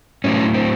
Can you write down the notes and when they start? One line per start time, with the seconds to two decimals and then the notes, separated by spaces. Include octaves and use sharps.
0.24 A2 F#3 A3 C#4
0.54 C4